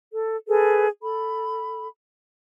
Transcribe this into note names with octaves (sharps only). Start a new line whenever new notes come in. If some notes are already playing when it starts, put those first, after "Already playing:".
A4
G#4 A4 B4
A4 B5